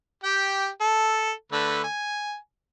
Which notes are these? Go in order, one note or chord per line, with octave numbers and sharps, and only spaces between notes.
G4 G5
A4
D3 A3 B4
G#5